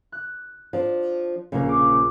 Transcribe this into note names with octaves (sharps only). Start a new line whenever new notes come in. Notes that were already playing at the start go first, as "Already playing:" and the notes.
F#6
F3 D4
A#1 C#3 F3 A#3
F5 D6 C#7